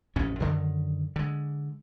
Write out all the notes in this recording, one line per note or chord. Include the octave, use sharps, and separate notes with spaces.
A1 F2 G#2 C#4
F#2 D3 D#3
D3 G#3